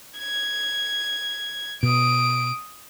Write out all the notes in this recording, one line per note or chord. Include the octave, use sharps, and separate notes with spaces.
G#6
B2 D#6 D7